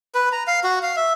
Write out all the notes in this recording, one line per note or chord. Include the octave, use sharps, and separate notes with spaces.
B4
A#5
F5
F#4
F5
E5